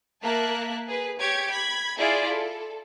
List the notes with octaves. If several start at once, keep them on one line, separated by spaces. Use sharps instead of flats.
A#3 A#4 E5 A5 F#6
G#4 B4
G4 C#5 G#6 D7
B5 G#6
E4 F4 G#4 D5 E5
A4